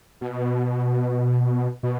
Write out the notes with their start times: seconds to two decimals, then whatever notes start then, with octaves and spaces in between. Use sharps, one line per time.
0.21 B2
1.83 B2